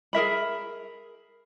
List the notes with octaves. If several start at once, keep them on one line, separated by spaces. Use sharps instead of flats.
G#4 A#4 E5 B5